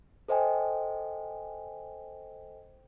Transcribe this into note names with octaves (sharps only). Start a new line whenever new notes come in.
A4 C5 D#5 G5 G#5